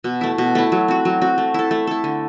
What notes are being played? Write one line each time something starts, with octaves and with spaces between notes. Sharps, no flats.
B2
A3 E4
B2
A3 E4
F#3
C4 F#4
F#3
C4 F#4
A3
E4 A4
A3
E4 A4
D3